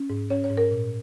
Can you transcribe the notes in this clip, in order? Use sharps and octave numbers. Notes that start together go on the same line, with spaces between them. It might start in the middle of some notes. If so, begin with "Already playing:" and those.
Already playing: C#4
G#2
C#4 C#5
C#5
G#2
A#4
A#2